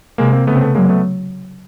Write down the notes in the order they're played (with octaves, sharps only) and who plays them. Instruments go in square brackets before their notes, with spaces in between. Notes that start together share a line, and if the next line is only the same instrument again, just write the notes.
[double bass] C3 [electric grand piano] G#3 A#3
[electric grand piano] A#3 C4
[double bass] C#3 [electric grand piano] A3 B3
[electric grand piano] C4
A3 B3
[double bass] F#3 [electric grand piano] G#3 A#3
[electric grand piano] A3 B3